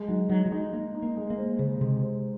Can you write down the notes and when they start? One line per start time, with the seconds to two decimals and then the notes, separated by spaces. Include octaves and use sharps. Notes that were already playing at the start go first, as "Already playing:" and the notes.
Already playing: G#3
0.08 F#3 D#4
0.29 F#3 D#4
0.46 F#3
0.52 G#3 D#4
0.73 A#3 D#4
0.95 D#4
1.02 A#3
1.17 G#3
1.30 A#3
1.38 C5
1.59 C#3 C5
1.81 C3 G#3
2.02 C5